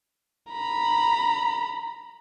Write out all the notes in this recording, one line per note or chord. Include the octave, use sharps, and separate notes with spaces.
A#5 B5